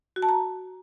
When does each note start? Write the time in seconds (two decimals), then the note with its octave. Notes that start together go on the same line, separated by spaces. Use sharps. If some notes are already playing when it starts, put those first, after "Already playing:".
0.16 F#4
0.22 A5
0.29 A#5